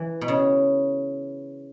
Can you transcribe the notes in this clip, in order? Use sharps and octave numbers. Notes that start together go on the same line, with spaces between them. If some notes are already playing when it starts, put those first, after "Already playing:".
Already playing: E3
B2
C#3